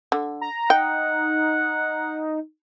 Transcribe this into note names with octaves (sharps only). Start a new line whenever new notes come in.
D3
A#5
D#4 F#5 G5